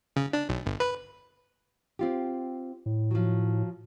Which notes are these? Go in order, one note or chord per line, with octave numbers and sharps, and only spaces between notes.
C#3
D4
B1
G1
B4
C4 F4 G4
A2
F3 F#3